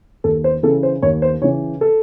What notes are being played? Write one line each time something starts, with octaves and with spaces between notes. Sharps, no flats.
D#2 A4
C5
C#3 E3 A4
C5
D#2 C#5
C5
C#3 E3 C#5
A4